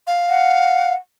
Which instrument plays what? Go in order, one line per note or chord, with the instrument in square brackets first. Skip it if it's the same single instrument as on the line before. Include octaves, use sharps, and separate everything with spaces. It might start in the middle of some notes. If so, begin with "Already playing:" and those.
[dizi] F5
[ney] F#5